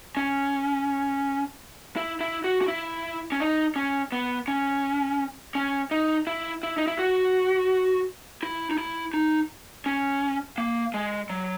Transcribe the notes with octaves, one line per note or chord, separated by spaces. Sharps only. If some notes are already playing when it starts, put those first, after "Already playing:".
C#4
E4
E4
F#4
F#4
E4
C#4
D#4
C#4
B3
C#4
C#4
D#4
E4
E4
D#4
E4
F#4
E4
D#4
E4
D#4
C#4
A#3
G#3
F#3